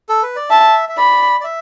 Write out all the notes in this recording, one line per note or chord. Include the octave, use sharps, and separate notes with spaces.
A4
B4
D5
E5 A5
E5
D5 B5
D5
E5